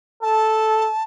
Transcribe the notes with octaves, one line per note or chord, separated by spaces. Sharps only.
A4 A5